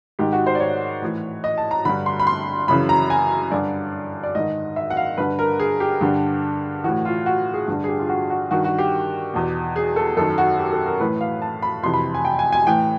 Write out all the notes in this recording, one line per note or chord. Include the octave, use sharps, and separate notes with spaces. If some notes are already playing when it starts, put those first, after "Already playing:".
G#2 D#3 G4
F#4
C5
D5
C#5
A2 E3
D#5
A5
A#5
G2 D3 B5
C6
B5
C6
F#2 C#3 E3 B5
A#5
G#5
G2 D3 D5
D5
G#2 D#3 D#5
E5
F#5
F5
G2 D3 B4
A#4
G#4
G4
G2 D3
A2 E3 F#4
F4
F#4
G#4
G2 D3
G#4
G4
F4
F#4
F#4
G2 D#3 F#4
F#4
G4
E2 B2
G#4
A4
F#2 D#3 A4
F#4
G4
A4
A#4
A2 E3 B4
F5
A5
B5
F2 C3 E3 C6
B5
G#5
G5
G#5
G#5
A2 E3 G5